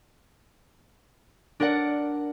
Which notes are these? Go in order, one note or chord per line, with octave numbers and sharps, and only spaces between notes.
D4 A#4 D5 F#5